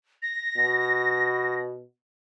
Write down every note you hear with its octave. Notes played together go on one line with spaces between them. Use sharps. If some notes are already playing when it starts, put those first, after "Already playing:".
A#6
B2